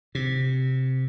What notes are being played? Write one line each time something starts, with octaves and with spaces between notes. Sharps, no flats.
C3